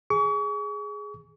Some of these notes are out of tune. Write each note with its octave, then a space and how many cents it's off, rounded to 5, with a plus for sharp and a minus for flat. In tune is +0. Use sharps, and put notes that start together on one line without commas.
G#4 +0 C#6 +40